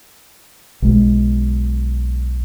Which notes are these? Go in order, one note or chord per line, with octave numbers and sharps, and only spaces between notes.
B1 G#3